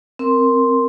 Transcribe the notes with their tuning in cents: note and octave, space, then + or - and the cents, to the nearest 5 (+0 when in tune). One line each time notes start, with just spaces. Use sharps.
C4 +0 A#4 +0 C6 +0